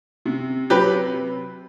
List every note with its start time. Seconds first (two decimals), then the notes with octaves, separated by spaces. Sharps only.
0.26 C3
0.70 F#3 G4 B4